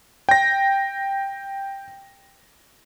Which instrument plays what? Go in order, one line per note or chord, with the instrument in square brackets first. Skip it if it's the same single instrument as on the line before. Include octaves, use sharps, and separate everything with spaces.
[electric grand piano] G5 A#6